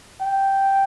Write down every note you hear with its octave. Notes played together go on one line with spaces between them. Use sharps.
G5